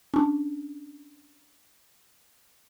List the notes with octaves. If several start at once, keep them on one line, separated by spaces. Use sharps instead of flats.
C#4 D4